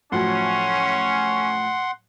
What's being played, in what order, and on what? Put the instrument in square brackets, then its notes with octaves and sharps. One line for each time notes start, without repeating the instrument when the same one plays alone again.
[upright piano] A2 F3 F#3 [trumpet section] C#4 [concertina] F#5 C6